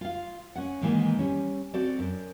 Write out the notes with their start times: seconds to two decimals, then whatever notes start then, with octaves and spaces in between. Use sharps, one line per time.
0.01 F4 F5
0.56 C#4 F#5
0.81 G#2 D#3 E3 G#3 A#3
1.19 G3 C#4
1.74 C4 F#4 A4 D5
1.99 F#2